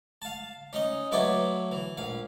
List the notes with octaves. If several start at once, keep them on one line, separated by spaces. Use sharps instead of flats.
F5 A5
C#4 D#4 D#5
F#3 A3 E4 B4 C#5 D5
E3
A#1 F5